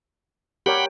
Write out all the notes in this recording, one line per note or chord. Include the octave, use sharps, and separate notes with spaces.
G4 A#4 C#5 F#5 G5 B5